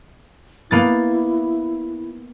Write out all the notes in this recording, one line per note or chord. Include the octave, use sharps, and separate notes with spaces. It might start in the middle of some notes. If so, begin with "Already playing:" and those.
A#3 B3 E4 A6